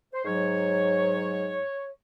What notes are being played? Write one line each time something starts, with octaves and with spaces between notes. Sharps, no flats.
C5
G#2 F#3 C#5